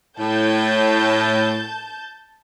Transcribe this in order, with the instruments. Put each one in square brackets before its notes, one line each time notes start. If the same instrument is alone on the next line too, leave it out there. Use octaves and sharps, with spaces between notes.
[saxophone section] A2 [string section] A5 G6